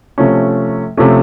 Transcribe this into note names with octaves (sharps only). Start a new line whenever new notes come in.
C3 F3 A3 C#4
C3 F3 A3 C#4